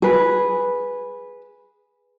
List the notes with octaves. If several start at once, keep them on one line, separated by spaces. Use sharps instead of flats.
G#4 B4